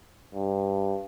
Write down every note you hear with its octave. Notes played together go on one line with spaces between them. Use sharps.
G2